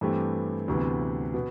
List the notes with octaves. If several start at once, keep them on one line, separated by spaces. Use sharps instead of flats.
G2 E3 A3 C4 G4
D2 C3 E3 B3
B2 B3